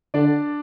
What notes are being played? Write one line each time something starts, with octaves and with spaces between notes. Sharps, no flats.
D3 D4 D5